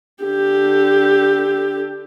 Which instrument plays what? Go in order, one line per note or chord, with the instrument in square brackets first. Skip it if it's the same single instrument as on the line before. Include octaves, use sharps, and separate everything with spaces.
[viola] D3 G4